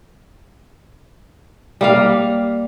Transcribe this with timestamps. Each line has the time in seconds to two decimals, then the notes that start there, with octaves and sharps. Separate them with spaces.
1.81 G3 A#3 F5